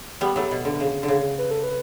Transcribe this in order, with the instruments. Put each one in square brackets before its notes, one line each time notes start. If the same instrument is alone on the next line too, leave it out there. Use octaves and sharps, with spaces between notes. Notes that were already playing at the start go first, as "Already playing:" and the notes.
[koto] G3 B3 [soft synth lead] G4
[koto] F#3 A3
B2
D3
C#3
D3
C#3
[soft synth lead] B4
A4
B4